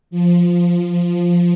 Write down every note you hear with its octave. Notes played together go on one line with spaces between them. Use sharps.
F3